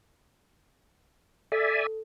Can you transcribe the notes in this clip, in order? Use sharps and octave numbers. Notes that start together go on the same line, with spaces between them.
A4 D5 E5 G#5